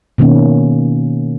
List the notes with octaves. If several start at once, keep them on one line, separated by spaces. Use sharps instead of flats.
B2 D#3 A#3 C#4